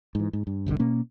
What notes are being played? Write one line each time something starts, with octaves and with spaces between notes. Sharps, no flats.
G#2 E3
G#2
G2
G1 C2 B2 D3
B2 A#3 C#4